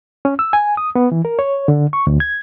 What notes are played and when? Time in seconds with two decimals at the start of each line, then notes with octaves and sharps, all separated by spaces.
0.25 C#4
0.39 E6
0.53 G#5
0.77 D#6
0.95 B3
1.12 E3
1.25 A#4
1.39 C#5
1.68 D3
1.93 C#6
2.07 D2
2.20 G#6